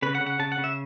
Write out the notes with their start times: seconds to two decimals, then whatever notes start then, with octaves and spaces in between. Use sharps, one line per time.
0.02 C#3 B4
0.15 F#5
0.21 C#3
0.27 F#5
0.39 C#3 A5
0.52 F#5
0.58 C#3
0.64 E5